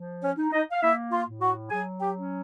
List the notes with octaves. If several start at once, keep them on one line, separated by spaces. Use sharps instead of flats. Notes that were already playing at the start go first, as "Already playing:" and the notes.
Already playing: F3
C#4 C#5
D#4
D#4 D#5
F5
A#3 E4 E5
F4 F5
A2
F#4 F#5
F#3 G#4 G#5
G4 G5
C#4